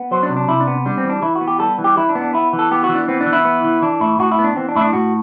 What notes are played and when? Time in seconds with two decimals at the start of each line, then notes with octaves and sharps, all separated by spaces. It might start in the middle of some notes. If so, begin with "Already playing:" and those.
Already playing: B3
0.11 F#3 C5
0.23 D4
0.29 C3
0.36 D4
0.48 C3 E4
0.60 D4
0.67 B3
0.86 G3 D4
0.98 C4
1.05 E3 D4
1.22 E3 E4
1.35 F#4
1.41 B3
1.48 G4
1.59 G3 A4
1.78 E3
1.84 G4
1.97 E3 E4
2.09 D4
2.15 B3
2.21 D4
2.33 B3 E4
2.53 E3
2.59 A4
2.71 B3 G4
2.84 F#4
2.89 E3
2.95 D4
3.08 B3 C4
3.21 D4
3.26 E3
3.33 E4
3.45 B3
3.64 E3
3.82 E3 D4
4.00 A2 E4
4.19 A2 F#4
4.32 E4
4.39 B3
4.44 D4
4.56 E3 C4
4.69 D4
4.76 A2 E4
4.81 D4
4.93 A2 F#4